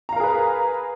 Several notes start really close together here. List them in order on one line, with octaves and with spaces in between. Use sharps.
A#5 F5 A#4 G#4 B4